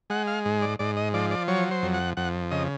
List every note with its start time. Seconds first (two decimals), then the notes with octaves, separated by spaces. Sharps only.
0.10 G#3 F#5
0.27 F5
0.45 G#2
0.62 D5
0.79 G#2 D5
0.97 D#5
1.14 F3 D5
1.31 D5
1.48 F#3 C#5
1.71 C5
1.83 F2
1.94 F#5
2.17 F2 F#5
2.51 C#3 D#5